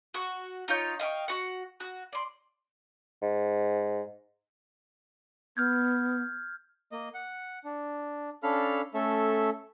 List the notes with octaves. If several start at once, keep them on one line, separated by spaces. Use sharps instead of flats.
F#4 C#6
D#4 F4 C#5 G6
D#5 F5 G5 C#6
F#4 F#5
F#4
D5 C6
G#2
B3 F6 G6 G#6
A#3 D#5
F#5
D4
C#4 D4 A4 F5 B5 F6
A3 C#4 A4 E5